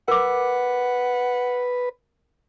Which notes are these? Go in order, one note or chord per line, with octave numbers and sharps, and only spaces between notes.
A#4 B4 F#5 D6